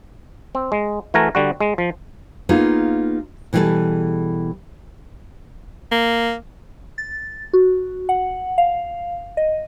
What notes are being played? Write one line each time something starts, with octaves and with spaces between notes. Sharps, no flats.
C4
G#3
E3 A3 F#4 A#4 G#5 A#5
D3 G3 F#4
G#3
F3
A#3 B3 D#4 F4 G#4
B2 E3 G3 F#4 G#4 A4
A#3
A6
F#4
F#5
F5
D#5